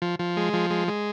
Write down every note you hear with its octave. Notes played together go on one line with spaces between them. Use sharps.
F3
F3
G#3
F3
G#3
G#3